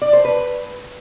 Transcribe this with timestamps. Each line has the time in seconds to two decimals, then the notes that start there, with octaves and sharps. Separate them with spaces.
0.02 D5
0.13 C5
0.25 B4